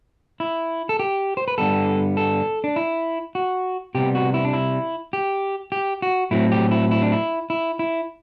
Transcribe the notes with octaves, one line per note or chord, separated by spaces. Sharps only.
E4
A4
G4
C5
B4
G2 D3 G3 B3 A4
A4
D4
E4
F#4
C3 G3 B3 G4
F#4
E4
D4
E4
G4
G4
F#4
A2 F#3 C4 E4
G4
E4
E4
D4
E4
E4
E4